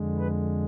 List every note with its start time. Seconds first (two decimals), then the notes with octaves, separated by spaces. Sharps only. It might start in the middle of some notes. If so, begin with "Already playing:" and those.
Already playing: F2 D3 G#3
0.19 B4